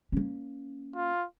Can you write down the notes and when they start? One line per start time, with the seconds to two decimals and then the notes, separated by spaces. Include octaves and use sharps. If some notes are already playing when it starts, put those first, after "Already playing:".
0.12 A#3 C#4
0.95 F4